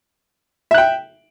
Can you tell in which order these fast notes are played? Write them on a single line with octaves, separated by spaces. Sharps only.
E5 F#6 G5